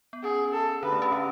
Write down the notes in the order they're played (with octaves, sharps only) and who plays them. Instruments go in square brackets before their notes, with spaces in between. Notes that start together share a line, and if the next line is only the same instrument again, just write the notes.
[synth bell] B3
[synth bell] C#4 [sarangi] G#4
[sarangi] A4
[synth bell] D3 D4 [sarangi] B4
[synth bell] A3
C#4
D3 D4